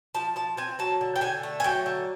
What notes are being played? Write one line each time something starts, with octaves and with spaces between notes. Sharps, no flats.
F3 A5
F3 A5
C4 G#5
F#3 A5
D3
G5
D3 G#5
A3
G#5
F#3 G5
D3